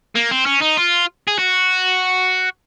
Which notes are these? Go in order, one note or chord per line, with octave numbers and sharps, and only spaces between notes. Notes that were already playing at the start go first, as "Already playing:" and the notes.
A#3
C4
C#4
D#4
F4
G#4
F#4